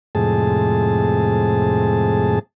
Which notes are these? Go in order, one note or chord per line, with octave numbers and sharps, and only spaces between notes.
F2 A2 C3 G#3 G#4 A5